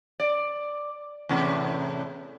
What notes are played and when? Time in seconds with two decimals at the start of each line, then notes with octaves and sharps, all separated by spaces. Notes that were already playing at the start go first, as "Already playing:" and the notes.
0.20 D5
1.29 E2 A2 C3